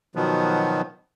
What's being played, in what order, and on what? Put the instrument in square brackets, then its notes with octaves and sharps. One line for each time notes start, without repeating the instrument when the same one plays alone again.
[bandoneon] B2 D#3 F3 F#3 B3